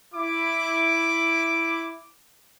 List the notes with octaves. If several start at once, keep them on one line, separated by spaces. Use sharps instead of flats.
E4 D6